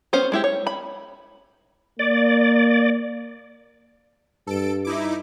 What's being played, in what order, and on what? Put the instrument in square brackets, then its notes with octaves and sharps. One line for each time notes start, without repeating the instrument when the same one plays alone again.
[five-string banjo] B3 C#4 C5
G#3 E4 G4
C#5
B5
[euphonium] A#3 [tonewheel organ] D5
[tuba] G2 [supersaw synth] A4 D7
[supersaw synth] D#4 E4 D6